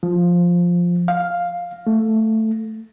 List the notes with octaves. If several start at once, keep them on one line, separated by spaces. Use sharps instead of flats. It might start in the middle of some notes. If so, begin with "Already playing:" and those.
F3
F5
A3